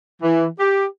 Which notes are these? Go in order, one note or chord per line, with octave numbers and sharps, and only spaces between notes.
E3
G4